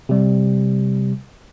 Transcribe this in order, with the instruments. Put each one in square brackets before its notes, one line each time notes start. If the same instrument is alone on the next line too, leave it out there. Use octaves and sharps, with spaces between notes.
[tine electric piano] C3 G3